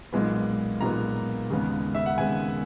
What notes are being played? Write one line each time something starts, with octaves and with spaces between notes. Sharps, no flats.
B1 A#2 G#3 B3
B1 A#2 G#3 B3 A#5
D#2 C#3 G#3 B3
E5
F#5
D#2 C#3 G#3 B3 G#5